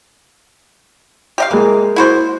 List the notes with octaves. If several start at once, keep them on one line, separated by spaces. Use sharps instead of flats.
G4 D#5 F5
E3 G#3 A#3
E4 F#4 C5